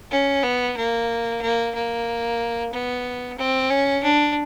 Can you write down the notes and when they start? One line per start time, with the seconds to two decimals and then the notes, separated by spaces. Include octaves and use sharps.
0.11 C#4
0.43 B3
0.77 A#3
1.41 A#3
1.75 A#3
2.73 B3
3.38 C4
3.70 C#4
4.04 D4